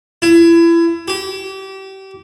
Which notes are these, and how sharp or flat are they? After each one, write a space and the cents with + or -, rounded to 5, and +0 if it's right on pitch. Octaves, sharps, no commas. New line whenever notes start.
E4 +30
G4 -30